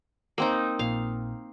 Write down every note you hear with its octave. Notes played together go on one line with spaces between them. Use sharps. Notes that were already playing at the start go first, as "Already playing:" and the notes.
A#3 C4 D#4
A#1 A#2 F5